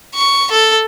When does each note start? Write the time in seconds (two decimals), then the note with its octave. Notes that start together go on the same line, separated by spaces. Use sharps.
0.15 C#6
0.52 A4